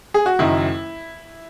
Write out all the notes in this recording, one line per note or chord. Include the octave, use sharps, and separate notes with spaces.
G#4
F#4
F#1 F#2 D#3 E4